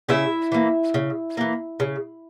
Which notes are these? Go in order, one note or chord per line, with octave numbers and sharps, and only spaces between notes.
C#3 E4 E5
E3 A#3
C#3
E3 A#3
C#3